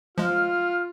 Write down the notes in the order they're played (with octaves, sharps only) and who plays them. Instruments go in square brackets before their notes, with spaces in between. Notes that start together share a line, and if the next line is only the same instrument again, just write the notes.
[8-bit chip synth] F3 G#3 [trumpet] F4 [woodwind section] F6